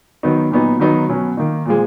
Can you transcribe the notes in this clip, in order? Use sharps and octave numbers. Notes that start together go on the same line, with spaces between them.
D#3 F#3 B3 D#4
A#2 F#3 B3 D#4
D#3 F#3 B3 D#4
B2 F#3 C#4
D#3 A#3 D#4
A#2 F3 G#3